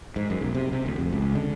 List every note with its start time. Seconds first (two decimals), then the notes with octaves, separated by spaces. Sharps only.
0.16 G#2
0.30 F#2
0.41 B1
0.55 C3
0.72 C3
0.86 D2
0.99 F2
1.13 C#2
1.35 D3